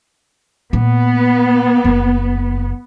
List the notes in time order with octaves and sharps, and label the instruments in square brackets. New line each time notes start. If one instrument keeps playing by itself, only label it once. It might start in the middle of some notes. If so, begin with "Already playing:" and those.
[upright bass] A#2 [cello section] B3
[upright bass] F#1